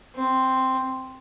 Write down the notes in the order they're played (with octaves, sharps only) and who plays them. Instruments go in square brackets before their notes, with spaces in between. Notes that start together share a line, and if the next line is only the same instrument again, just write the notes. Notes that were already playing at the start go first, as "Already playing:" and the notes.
[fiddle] C4